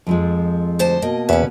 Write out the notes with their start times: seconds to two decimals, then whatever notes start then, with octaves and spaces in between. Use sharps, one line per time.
0.07 F2 F3 G#3
0.79 D2 C5 A5
1.02 B2 A#3 D#5
1.29 E2 C#4 B4 E5